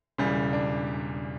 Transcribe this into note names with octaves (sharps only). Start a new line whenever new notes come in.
E1 E2 C#3 G3
D4